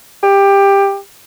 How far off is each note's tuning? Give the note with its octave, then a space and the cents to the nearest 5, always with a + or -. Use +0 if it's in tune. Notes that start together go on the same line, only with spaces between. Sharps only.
G4 +15